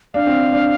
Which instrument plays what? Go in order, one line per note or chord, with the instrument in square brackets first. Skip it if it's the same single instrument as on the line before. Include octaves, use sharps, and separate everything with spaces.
[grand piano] D4 [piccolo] F5
[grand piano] C4
D4